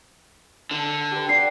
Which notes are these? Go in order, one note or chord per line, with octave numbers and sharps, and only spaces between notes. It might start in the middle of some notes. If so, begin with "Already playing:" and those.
D3 A5
G4 A4 B4
D5 F#5 G5 C7